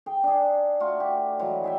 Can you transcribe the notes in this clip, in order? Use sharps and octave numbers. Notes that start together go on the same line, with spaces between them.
G#4 G5
D4 G#4
A3 F4 F#4
G4
E3 F#3 G#3
G#4 E5 G5